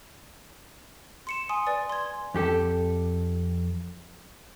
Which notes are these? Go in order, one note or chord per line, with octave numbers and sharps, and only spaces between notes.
C6 C#7 E7
G#5 C6 D#6
B4 D5 G#5 A6
C6 G#6
F2 G4 A4